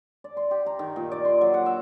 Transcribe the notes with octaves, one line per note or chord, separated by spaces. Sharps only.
D5
C6
G4
A#5
D#3
A#2
D5
C6
F#3
F#5
E5